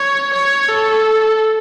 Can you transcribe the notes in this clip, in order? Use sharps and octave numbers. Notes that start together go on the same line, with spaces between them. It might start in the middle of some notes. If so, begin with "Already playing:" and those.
Already playing: C#5
C#5
A4